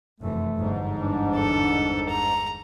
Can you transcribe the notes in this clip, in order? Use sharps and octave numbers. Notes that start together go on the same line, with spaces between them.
F1 F#2 E3 A3
G1 E2 G#2
D4
A4
A#5